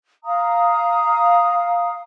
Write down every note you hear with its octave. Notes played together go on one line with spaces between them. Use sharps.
F5 A#5 D#6